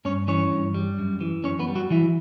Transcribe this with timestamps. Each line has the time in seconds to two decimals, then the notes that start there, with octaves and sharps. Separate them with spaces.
0.05 G2 C#4 C#5
0.28 E3 C#4 C#5
0.51 G2
0.74 G3
0.99 F#2
1.21 E3
1.44 F#2 C#4 C#5
1.59 B3 B4
1.68 G3
1.75 F#3 F#4
1.90 E3 F#3 E4